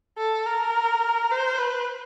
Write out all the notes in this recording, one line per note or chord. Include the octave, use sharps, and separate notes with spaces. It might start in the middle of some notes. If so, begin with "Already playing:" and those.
A4
A#4
C5
B4